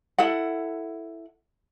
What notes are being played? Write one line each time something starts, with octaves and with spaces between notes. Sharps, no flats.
E4 A4 F#5